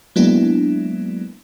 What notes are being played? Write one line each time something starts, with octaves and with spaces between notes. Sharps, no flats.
F#3 G#3 A#3 B3 D4 E4